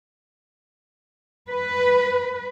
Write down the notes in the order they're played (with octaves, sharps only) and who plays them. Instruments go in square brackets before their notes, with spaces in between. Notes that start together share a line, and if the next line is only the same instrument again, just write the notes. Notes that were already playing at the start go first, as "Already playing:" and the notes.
[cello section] B4